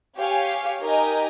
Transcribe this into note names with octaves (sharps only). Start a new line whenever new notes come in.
G4 C#5 F5 G#5
D#4 G4 A#4 D#5 G#5